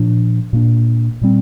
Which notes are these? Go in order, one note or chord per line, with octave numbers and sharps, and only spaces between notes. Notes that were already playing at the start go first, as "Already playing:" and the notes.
Already playing: A#2 F3 D4
A#2 A#3 D4
A#2 G3 C4